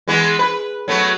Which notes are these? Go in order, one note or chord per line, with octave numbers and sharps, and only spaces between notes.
E3 G#3 B3
B4
F#3 A3 B3